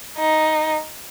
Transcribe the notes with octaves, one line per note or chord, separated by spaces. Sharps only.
D#4